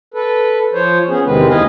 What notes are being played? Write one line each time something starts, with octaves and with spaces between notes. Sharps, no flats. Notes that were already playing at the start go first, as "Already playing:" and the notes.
A4 B4
F3 C5 C#5
B3 C#4 G#4
E2 C3 D#3 G#3 C4 B4
D2 E3 B4 D#5 F5 G#5